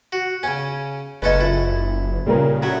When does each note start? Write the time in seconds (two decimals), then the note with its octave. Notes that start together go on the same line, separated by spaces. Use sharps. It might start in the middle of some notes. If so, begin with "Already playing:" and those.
0.12 F#4
0.43 C#3 C#4 G#5
1.22 F#1 G#3 C#4 A4 B4 D#5
1.40 F#1 E4 F4
2.26 A#2 C#3 G3 A#4
2.62 A2 F#3 E5